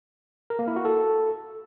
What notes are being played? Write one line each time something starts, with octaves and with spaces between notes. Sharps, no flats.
A#4
A#3
E4
F#4
A4